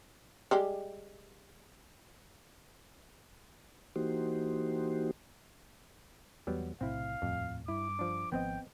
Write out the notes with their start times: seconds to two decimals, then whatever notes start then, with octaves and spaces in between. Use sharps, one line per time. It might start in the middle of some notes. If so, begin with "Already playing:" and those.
0.51 G3 G#3 G4
3.96 E3 A#3 D#4 F#4 G4 C5
6.47 E2 F#3 G3 B3
6.81 B1 A2 C3 C4 E4 F5
7.22 D#1 F2 A2
7.68 G2 E4 D6
7.99 F3 D4
8.32 G#1 F3 B3 C4 D#5 G5